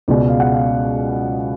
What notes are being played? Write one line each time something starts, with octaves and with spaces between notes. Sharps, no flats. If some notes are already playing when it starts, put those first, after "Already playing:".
C#2 B2 G#3 D5
F5
F#5
F5